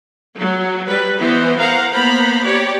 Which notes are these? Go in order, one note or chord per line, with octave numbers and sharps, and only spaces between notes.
F#3
G3 B4
E3 B3 C5 D#5
A#4 C5 F5 F#5 A#5
A#3 B3 C5 A#5 B5
G4 C#5 D5